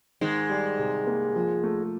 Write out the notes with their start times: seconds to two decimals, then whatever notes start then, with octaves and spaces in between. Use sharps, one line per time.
0.21 G#2 D#3 G#3
0.50 G3
0.79 C3
1.07 A#3
1.36 F3
1.64 A3